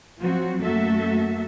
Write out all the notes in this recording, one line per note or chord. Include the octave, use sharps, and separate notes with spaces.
F3 F#3 C4 F#4
F#2 A3 A#3 F#4 A4 E5